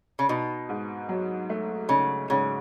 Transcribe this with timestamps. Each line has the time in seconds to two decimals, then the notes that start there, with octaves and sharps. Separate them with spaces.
0.19 C#3
0.29 B2 D#4
0.69 G#2
1.09 F#3
1.50 A3
1.89 C#3 D#4
2.30 G#2 C#3